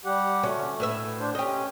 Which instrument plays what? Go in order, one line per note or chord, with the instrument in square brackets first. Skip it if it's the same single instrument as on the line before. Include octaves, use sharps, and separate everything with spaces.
[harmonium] G3 G4 F#5
[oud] D2 C#4 [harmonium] A3
[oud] A2 B4 E5
[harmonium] D4 C5
[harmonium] C#4 [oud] G4 D#5